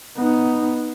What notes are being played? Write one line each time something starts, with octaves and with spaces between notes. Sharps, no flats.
B3 D#4